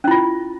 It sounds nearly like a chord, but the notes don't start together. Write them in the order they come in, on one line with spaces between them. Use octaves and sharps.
C#4 E4 F4